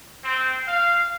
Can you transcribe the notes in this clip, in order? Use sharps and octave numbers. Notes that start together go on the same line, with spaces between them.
C4
F5